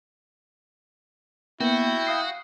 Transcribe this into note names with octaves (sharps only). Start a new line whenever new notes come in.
A#3 B3 E4 F#4 G5
F5 D#6 C7